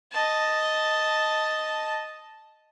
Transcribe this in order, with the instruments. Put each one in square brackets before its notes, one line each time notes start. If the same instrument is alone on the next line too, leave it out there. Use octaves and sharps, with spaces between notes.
[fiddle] D#5 A5